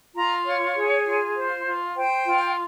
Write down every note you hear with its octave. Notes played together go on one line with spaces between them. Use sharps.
F4 A#5
C#5
G#4
F4
C5
F4
C5 G5
F4